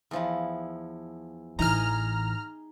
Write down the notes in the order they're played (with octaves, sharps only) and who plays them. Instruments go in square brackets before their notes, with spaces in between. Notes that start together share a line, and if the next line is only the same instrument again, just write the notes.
[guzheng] E2 F3 E4
[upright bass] A1 E3 [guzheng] D#4 G#4 G#5 [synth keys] A#5 F6